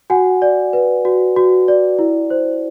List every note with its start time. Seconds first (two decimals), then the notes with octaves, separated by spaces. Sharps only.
0.10 F#4 F#5 G#5
0.42 D5
0.73 B4
1.05 F#4
1.36 F#4
1.68 D5
1.99 E4
2.30 C5